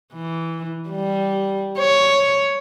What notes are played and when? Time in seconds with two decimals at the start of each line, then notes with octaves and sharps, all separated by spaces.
0.14 E3
0.89 G3
1.79 C#5